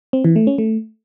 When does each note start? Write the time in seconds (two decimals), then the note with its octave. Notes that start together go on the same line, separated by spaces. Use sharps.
0.13 C4
0.24 E3
0.36 A3
0.47 C#4
0.58 A3